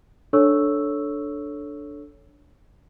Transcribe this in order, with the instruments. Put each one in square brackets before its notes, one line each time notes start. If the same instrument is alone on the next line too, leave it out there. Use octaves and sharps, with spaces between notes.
[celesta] D4 A4 C#5 C#6 E6